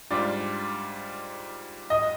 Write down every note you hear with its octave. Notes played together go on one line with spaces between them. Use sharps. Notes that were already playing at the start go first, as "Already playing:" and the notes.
G#2 G3 D4 F4 D5
D#5